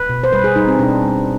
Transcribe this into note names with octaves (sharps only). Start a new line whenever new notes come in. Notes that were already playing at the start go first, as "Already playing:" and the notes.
Already playing: B4
B2
C5
G3 B4
G#4
G3 D#4
C4
B2 D4
G3